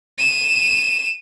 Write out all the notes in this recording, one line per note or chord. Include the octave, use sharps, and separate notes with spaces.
D#7 E7